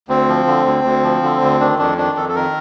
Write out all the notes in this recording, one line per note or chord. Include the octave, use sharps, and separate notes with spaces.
D2 C4
F3
D3
D2
D2
F3
D3
D2
D#3 D4
F2 D4
D#3 D4
F2 A4
A4
D#3 A#4